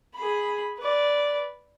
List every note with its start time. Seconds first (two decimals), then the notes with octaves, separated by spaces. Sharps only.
0.15 G#4 B5
0.78 B4 D5